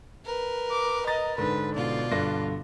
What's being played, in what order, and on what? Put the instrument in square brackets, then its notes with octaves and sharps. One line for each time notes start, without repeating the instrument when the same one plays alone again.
[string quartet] A#4 B4
[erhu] D6
[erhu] D#5 [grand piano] A#5 A6
[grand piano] G#2 D3 [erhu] B4
[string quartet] B2 F4 [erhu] D5
[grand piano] G2 D3 A#6